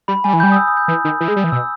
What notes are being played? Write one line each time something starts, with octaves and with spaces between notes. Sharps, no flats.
G3 B5
G3 G#5
E3
G3 G6
D#6
E6
D#6
G6
E3
D#3
E3
G#3
G3
E3
B2 E6